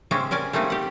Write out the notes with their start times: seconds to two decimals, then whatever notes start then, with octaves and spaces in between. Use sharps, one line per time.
0.11 C#3 G3 G#3 C4 C#4
0.31 C#4 A#4 D5 G#5
0.53 G3 A3 A#3 C4 D#4
0.70 G4 F#5